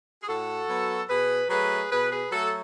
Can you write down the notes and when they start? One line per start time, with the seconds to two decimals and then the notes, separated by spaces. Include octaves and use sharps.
0.22 G#4
0.28 A2 F#4 A4
0.69 F#3 B3
1.09 B2 G#4 B4
1.49 F#3 A3 G#4 B4
1.91 B2 G#4 B4
2.11 G#4 B4
2.31 F#3 A3 F#4 A4